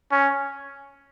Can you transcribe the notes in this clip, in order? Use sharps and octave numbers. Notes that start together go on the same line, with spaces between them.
C#4